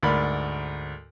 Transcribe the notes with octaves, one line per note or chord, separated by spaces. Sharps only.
D2 G#2 A#4 D5 B5